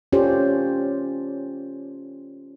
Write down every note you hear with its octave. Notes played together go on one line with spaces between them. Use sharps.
C#4 F4 G4 A4 C5 D5